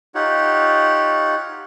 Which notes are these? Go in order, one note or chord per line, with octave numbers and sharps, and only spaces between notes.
D#4 F4 G4 C#5 F#5